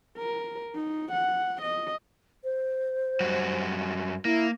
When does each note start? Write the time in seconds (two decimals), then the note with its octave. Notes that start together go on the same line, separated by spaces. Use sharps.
0.18 A#4
0.75 D#4
1.12 F#5
1.62 D#5
2.44 C5
3.20 F#2 G3 F#4
4.25 A#3 E4